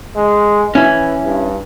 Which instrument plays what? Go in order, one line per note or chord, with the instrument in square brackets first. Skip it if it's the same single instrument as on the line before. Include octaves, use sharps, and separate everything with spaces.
[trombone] G#3
[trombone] E3 [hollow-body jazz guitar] C#4 E4
[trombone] G2